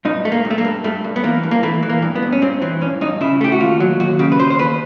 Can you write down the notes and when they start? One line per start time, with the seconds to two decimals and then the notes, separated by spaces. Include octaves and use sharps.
0.05 G2 D#4
0.25 A3
0.32 A#3
0.45 G2
0.50 A3
0.58 A#3
0.65 G2
0.84 G2 A3
1.04 G2
1.16 B3
1.24 E3 A#3
1.43 G2
1.51 A#3
1.63 E3 A3
1.83 E3
1.90 A#3
2.02 G2
2.16 B3
2.22 G2
2.32 C#4
2.42 G2 C4
2.62 E3 C4
2.81 G2 C#4
3.01 G2 D#4
3.21 C#3 E4
3.41 A3 G4
3.52 F#4
3.60 D#2 F4
3.80 F#3
4.00 D#2 F#4
4.19 C#3 G4
4.32 B4
4.39 D#2 C5
4.50 C5
4.59 D#2 B4